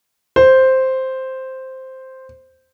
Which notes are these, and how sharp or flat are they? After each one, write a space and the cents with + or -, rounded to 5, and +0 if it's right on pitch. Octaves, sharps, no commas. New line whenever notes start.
C5 +0